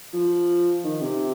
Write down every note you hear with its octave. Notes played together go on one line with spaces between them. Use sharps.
F3
D#3
C3